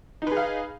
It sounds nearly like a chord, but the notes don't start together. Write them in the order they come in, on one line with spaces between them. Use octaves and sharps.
D#4 B4 G#4 F5